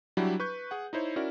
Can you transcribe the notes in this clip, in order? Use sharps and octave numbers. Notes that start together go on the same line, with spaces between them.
F#3 G3 D4 E4 F#4 G4
B4 C#6 G6
G#4 F#5
D#4 E4 C5 C#5
C#4 E4 F#4 A#4 D5